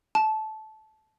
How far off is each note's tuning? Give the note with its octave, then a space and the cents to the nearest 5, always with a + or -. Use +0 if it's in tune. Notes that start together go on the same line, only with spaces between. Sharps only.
A5 -15